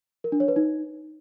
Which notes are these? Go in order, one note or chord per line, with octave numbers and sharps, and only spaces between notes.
A#4
D4
C#5
B4
D#4